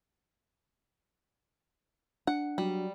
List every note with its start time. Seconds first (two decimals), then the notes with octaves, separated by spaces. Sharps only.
2.27 D4 F#5
2.58 F#3 G3